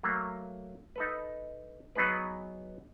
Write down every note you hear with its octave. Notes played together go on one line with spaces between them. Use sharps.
F#3 A3 A#3
D#4 A4 B4
F#3 B3 D#4 G#4 B4